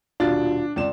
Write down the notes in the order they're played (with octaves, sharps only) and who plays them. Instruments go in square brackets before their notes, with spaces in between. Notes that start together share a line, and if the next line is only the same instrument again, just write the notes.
[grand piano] D#1 B2 A6 [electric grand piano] D4 [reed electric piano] F4
[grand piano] C#2 D5 E7